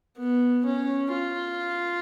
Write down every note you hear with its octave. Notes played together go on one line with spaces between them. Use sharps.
B3
C#4
F4